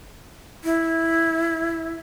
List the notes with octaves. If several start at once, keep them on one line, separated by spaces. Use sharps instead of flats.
E4